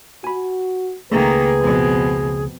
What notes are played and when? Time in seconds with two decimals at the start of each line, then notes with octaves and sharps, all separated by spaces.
0.24 F#4 G#5 B5
1.11 C#2 G#2 D#3 A3 A#3 G#4 B4
1.60 F2 B2